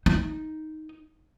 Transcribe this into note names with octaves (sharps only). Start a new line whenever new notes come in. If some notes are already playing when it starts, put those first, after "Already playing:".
D#4